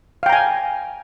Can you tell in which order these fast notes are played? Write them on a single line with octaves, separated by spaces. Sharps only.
F5 G5 A#5 G#5